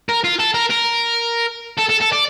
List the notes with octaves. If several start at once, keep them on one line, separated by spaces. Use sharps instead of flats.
A#4
F4
A4
A#4
A#4
A4
A4
A4
D5